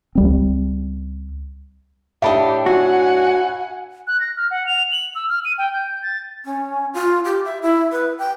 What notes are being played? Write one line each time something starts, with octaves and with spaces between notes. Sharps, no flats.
C#2 G3 C4
A2 D4 G4 D#5 E5 A5 B5
F#4 F#5 G#5
F#6
A#6
F6
F#5
F7
F#7
E6
F6
D#7
G5
G6
A6
C#4
F4
G4
E5
E4
B4
G5